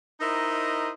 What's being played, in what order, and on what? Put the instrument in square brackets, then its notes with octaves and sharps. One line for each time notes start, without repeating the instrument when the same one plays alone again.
[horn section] D#4 E4 A#4 C5 D#5